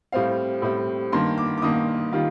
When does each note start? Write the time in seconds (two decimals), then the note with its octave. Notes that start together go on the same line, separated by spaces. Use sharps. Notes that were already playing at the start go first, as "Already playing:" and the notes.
0.12 A2 G3 C4 F5
0.62 A2 G3 C4
1.13 G2 D#3 A#3 C6
1.38 D6
1.58 D6
1.62 G2 D#3 A#3 D#6
2.12 D#3 G3 A#3 F4